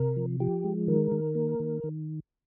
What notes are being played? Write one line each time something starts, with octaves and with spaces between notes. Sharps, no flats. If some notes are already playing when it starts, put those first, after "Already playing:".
Already playing: C3 A#4
F3
F3 G4
G#3
D#3 A#4
D#3
A#3
D#3
D#3